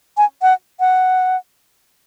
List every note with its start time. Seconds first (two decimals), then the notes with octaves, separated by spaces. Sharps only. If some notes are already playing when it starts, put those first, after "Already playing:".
0.17 G#5
0.42 F#5
0.80 F#5